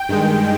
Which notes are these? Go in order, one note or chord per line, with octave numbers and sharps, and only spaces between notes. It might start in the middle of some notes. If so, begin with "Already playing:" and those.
Already playing: G5
G2 D#3 G#3